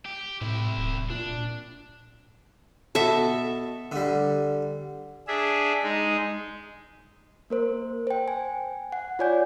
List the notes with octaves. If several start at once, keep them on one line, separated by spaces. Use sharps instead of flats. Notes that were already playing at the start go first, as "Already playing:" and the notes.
G4
A2 C3 E4
D1
A#2 D4
B2 A4 E5
D3 G3
D4 G#4 E5
G#3 D#4
A#3 A#4 C5
C5 G5
G#5
F#5
F4 C#5 D5 G#5 G6